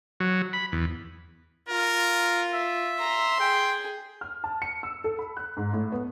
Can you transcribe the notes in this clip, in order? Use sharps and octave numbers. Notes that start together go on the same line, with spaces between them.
F#3
B5
E2
F4 A#4
E5
A#5 C6
G#4 G5
F6
A5
C#7
E6
A4
B5
F#6
G#2
A2
B3